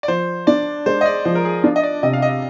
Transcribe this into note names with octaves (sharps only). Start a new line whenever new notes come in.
D5
F3 C5
D4 D5
G#3 C5
D#5
D5
F3 C5
A#4
G#4
D4 F4
D#5
D5
C3 D#5
F5
D#5